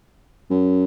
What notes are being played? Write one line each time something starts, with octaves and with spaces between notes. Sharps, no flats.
F#2